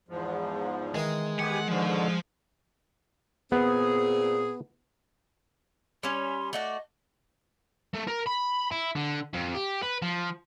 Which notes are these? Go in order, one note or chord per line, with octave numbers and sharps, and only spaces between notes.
E2 G#2 F3
D#3 E3 G#3 D#4
B3 G4 F#5 G#5
G#2 B2 D3 F3 C5
A#2 B3 C4 G#4
G3 C#4 C6
A3 F#4 D5 D#5
A3
A#4
B5
E4
D3
F2
G4
B4
F3